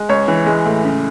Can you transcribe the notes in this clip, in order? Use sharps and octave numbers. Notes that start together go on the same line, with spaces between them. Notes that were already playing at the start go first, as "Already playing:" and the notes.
Already playing: G#3
C#2 C#5
E3
G#3
A2
C#3